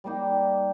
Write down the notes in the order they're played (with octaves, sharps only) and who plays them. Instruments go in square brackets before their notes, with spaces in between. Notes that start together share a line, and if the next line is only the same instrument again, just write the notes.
[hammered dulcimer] G3 A#3 D#4 G4